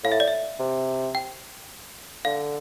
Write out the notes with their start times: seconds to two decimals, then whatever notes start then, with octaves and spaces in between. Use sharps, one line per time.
0.04 A2 F5
0.12 E5
0.20 D5
0.28 E5
0.60 C3
1.15 G5
2.25 D3 F5